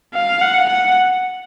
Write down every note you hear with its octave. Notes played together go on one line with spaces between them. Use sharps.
F5
F#5
F#5